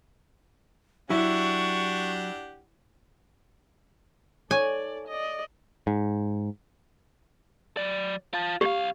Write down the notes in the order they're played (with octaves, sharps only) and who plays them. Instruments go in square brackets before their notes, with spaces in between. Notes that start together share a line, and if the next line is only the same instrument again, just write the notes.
[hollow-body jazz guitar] F#3 [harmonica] D4 G4 F#5 [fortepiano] E4 [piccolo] C#6
[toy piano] D#4 C#5 C#6 [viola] A4 D5 [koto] G#5
[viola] D5 D#5
[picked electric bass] G#2
[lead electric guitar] F#3 D5
F4 A5
[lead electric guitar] C2 F5 [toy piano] G4